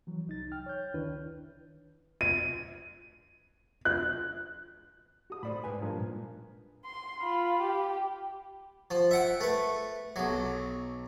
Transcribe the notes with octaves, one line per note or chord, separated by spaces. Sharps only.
E3 F#3
C2 D#4 A6
G5 F6
C#5 G6
C#2 D#3 D4 E4 B4
D#7
F#6
F#4 D#6
A2 C5 D5 B5
G#2 B4 G#5
G2 F3 A#3
A#2
C6
F4 B5
G4
F3
E5 F#5 G5
A3 B4
B1 F#3